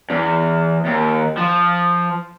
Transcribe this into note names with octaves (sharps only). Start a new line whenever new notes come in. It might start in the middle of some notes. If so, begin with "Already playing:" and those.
E2
D#2
F3